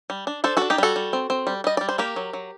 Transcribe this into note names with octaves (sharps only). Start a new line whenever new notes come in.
G3
D4
D4 A4 C5
D4 F#4 A4
D#4 G4
G3 F#4 A4
G3
C4
C4
G3
G3 D#5
G3 D5
C5
A#3 G4 A#4
F#3
F#3